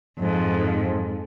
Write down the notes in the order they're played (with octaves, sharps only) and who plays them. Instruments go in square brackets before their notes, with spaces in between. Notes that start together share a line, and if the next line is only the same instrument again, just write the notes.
[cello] F2 G#2